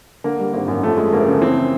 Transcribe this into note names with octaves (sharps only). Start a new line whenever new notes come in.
D3 A#3
G3
G#1 A#3
F#2
F3 A3
G#3
D2 A#3
C#3
E3 C4